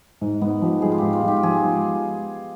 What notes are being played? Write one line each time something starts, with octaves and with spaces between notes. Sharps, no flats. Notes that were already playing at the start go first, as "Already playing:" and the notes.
G#2 G#3
G#2 B3
F3 G4
G#3 G#4
F4
G#2 G4
F4
G#2 G4
G4
F3 G#4
G#3